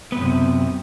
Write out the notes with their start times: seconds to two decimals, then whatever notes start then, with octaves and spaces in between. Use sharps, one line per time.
0.12 B3
0.17 F#2
0.21 C3